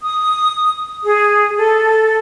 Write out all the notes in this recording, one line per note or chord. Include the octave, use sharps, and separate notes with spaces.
D#6
G#4
A4